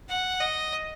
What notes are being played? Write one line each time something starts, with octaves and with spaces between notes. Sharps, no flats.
F#5
D#5